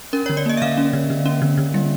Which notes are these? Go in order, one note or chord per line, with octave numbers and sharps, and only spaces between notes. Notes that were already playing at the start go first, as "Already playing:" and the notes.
C#4 A#4
D3 C#5
D5
A#3 D#5
E5
D3 F5
C#4
D3
D3
C#4
D3
D3
G3